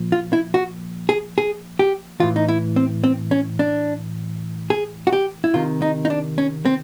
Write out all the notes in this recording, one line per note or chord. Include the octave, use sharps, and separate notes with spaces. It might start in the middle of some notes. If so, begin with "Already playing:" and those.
Already playing: A#2 F3
F4
E4
F#4
G#4
G#4
G4
A2 E3 F4
D#4
E4
C4
C4
C#4
D4
G#4
F#4
G4
E4
C3 D#3 F4
D#4
D#4
D4
C#4
C4